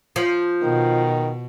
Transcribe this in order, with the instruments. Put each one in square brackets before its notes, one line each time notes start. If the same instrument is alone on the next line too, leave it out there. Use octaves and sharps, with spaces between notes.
[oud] F3
[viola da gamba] B2 [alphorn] D#3